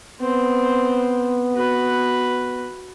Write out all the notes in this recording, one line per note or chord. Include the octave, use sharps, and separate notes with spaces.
B3 C4 C5
F#4 B4